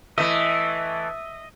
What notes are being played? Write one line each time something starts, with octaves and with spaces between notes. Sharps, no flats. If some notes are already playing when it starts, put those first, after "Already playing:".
E3 A3 D#5 E5